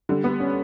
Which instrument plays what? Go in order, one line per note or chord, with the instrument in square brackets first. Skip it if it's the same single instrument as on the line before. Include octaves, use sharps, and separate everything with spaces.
[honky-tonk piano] D3 [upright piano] G3
[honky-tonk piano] B3
[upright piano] C#4